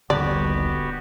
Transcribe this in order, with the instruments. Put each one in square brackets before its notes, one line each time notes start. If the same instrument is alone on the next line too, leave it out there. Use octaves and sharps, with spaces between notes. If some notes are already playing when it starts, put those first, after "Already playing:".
[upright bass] D#1 A#1 [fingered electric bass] D3 [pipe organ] B3 F#4 G4 [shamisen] D5